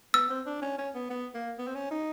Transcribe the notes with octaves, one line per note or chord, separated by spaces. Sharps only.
B3 E6
C4
D4
C#4
C#4
B3
B3
A#3
B3
C4
C#4
D#4